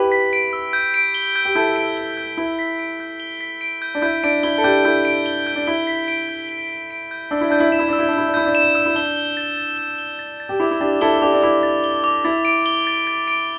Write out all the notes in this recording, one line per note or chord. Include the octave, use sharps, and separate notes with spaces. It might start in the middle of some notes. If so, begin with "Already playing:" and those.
Already playing: E4 G4 B4
B6
D7
E6
G6
D7
G7
G6
G4
E4 A4 G6
D7
G7
G6
E4 G7
B6
D7
G6
G7
B6
D7
G6
D4
E4 G6
D4 D7
E4 G7
A4
D4 G4 G6
E4 A4 G6
D7
G7
G6
D4
E4 G7
B6
D7
G6
G7
B6
D7
G6
D4 E6
E4
D4 G6
E4
D4 E7
E4
D4 E6
E4
D4
E4 E6
D4
E4 G6
D4
E7
E6
E4
D4 G7
G7
A6
A6
G7
G7
A6
A6
G4
E4 D6
E4
D4 G4 A6
E4 A4 G7
A4
D4 G4 D6
D4
E4 D6
A6
G7
D6
E4 A6
D7
G7
A6
A6
D7